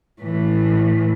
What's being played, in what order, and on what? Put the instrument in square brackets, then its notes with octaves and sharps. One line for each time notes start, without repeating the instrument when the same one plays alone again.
[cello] A2 E3